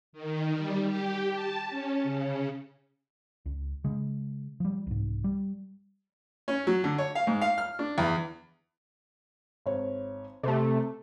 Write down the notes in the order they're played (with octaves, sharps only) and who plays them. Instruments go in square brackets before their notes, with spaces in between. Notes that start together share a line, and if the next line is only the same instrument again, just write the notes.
[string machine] D#3
G3
G4
A5
C#4
C#3
[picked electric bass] C#2
C#3 G#3
F3 G3
C2 G#2
G3
[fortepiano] C#4
F#3
D3
C#5
F5
G#2
F5
F6
D4
E2
[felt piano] G#1 C#5
[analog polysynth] C3 A3 [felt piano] A4